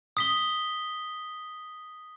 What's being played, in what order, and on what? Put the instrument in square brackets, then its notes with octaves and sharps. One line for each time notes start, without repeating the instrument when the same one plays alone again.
[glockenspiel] D#6 B6 G7